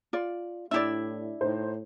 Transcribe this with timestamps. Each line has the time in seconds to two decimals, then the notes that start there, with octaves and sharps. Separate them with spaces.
0.13 F4 D5
0.71 A2 D4 E4 G4 D5 E5
1.41 A2 D#4 C5